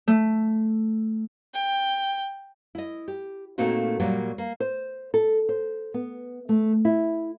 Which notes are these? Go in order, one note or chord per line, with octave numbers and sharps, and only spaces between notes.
A3
G5
E4 D#5
G4
A#2 A3 A#3 C4 D#4 F#4
A#2 F#3 G3 A#3
A#3
C5
A4
C5
B3
A3
E4